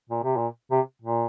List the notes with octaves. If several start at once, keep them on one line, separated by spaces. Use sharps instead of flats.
A#2
C3
A#2
C3
A#2